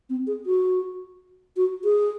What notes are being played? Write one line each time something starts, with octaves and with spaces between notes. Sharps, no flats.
C4
G#4
F#4
F#4
G#4